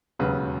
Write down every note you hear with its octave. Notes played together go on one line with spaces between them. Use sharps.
E1 D#2 C#3 F#3 B4